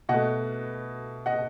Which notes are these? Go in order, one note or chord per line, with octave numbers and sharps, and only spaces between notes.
B2 A3 D#5 F#5
D#5 F#5